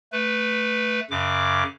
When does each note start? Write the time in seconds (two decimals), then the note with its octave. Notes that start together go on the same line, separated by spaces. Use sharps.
0.12 A3 B4
1.10 F#2 C#3 D6